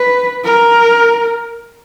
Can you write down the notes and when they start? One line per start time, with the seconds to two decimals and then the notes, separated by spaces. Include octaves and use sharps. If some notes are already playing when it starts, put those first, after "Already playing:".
Already playing: B4
0.45 A#4